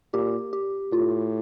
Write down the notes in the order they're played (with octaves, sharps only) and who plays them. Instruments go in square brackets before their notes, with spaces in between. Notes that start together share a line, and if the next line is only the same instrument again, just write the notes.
[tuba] A#2 [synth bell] G4
[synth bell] G4
[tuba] A2 [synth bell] F4